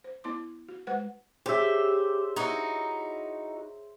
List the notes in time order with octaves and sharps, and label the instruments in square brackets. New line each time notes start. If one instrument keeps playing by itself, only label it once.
[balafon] C5
B3 E4 C6 D6
F#4
G#3 B4 C5 F#5
[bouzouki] G4 [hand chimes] G#4 C#5 [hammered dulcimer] C5 E5
[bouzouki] D#4 E4 F#4